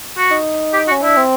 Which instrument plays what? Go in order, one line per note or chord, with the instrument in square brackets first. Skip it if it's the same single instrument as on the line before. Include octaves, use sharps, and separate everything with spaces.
[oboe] F#4
[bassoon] D#4
[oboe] G4
F#4
[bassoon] C#4
[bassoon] D4 [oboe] E4
[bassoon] C4